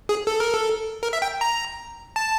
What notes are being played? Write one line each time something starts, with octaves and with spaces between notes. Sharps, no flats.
G#4
A4
A#4
A4
A#4
E5
G5
A#5
A5